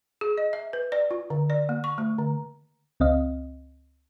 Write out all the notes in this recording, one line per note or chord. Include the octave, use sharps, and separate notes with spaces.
G#4
D#5
E5
B4
D5
F4
D3
D5
A#3
C#6
A3
D3
C#2 C4 D#5 F5